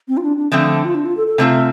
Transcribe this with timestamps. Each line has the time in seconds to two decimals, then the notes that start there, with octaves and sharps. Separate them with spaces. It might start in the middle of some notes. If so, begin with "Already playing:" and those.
0.08 C4
0.17 F4
0.23 D4
0.37 D4
0.52 D3 F3 A3 C4 D4
0.85 F4
0.95 D4
1.06 F4
1.17 A4
1.27 A4
1.38 C3 A3 C4 F4